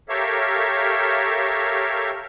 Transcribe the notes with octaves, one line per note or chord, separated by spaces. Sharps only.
G4 A4 A#4 C#5 E5 F5